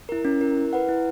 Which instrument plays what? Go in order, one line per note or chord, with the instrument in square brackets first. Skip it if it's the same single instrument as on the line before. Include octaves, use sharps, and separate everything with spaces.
[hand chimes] E4 A#4
C#4
E4 A#4
E4
B4 F#5
E4